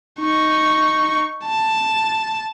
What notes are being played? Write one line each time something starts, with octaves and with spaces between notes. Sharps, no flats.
D#4 C#6
A5